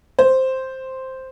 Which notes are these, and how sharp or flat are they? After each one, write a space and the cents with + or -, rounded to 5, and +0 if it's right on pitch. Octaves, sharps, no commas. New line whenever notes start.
C5 +0